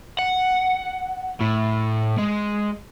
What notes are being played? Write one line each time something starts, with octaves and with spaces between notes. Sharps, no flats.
F#5
A2
G#3